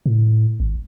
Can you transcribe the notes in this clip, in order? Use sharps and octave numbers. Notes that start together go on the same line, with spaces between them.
A2
G#1